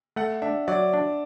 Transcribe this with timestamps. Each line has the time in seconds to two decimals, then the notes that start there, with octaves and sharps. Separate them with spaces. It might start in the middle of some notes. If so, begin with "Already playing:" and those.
0.16 A3 F#5
0.42 D4 E5
0.68 F#3 D5
0.93 D4